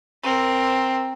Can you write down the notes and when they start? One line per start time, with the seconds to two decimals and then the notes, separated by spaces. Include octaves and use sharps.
0.23 C4 A#4